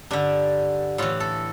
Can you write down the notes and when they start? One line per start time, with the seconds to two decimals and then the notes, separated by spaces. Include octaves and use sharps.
0.11 G2 D3 D4
0.98 A2 E3 F4
1.20 A4